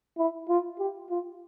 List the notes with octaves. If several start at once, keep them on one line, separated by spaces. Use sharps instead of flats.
E4
F4
G4
F4